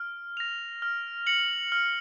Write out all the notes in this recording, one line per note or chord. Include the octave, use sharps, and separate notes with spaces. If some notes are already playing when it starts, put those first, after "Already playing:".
Already playing: F6
A#6 F7
F6
A#6 C#7 F#7
F6